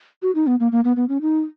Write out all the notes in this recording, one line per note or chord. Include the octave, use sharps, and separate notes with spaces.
F#4
D#4
B3
A#3
A#3
B3
B3
C#4
D#4